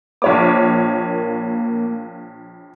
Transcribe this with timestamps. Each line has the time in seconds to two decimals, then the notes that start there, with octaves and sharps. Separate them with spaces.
0.22 A#1 A#3 C#5 D6